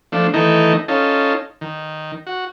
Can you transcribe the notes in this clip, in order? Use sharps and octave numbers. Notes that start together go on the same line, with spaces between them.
F3 A3 D4
D#3 E3 A3 D#4
C#4 D#4 F4 A4
D#3
F#4